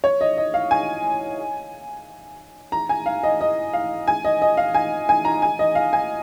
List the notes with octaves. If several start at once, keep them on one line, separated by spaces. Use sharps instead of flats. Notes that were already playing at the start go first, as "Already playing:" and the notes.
C#5
D#5
D#5
F5
G#5
A#5
G#5
F5
D#5
D#5
F5
G#5
D#5
D#5
F5
G#5
G#5
A#5
G#5
D#5
F5
G#5